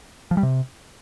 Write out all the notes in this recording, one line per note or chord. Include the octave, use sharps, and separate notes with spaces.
F3
G3
C3